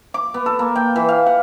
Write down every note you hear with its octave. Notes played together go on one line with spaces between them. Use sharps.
D6
B3
A4
A#3
G5
E3
F5
F#5